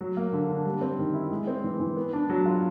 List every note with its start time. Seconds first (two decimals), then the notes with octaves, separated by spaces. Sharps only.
0.01 F#3
0.17 A#3
0.33 D3
0.50 D4
0.66 G3
0.81 C4
0.99 D#3
1.14 E4
1.31 G#3
1.47 C4
1.64 E3
1.80 E3
1.97 B3
2.13 D4
2.30 F#3
2.46 F4